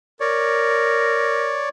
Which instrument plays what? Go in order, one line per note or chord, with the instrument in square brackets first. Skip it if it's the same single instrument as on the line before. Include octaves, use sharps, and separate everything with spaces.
[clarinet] A#4 [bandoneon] C#5 D5